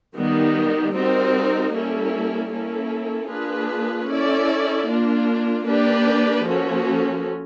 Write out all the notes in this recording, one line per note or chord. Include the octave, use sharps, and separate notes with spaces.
D#3 G3 B3 D#4
G3 C4 D#4 F#4 A#4
G3 A#3 C#4 E4 A4
A#3 C#4 E4 A4
A#3 D4 F4 G#4 B4
C#4 E4 A4 D5
A#3 D4 F4
A#3 D4 G4 B4 D5
F3 A#3 C#4 F#4 A4